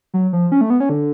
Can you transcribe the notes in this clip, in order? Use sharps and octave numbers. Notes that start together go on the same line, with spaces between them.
F#3
F3
C#4
A3
B3
C#4
D3